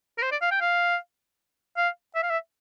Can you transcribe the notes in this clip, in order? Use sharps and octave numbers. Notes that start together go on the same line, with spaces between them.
A#4
C5
D5
F5
G5
F5
F5
E5
F5
E5